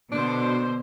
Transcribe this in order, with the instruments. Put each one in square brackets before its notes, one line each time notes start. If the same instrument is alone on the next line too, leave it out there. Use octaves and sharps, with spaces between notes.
[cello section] B2 [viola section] D3 C5 [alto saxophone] D4